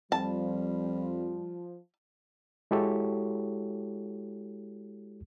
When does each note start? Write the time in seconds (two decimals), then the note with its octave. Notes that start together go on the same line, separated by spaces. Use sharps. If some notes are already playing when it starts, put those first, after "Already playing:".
0.12 F2 F3 G3 A5
2.71 G#3 E4 F#4 G4 A4 C#5